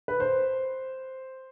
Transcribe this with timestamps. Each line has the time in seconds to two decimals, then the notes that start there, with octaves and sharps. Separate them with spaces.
0.08 B4
0.20 C5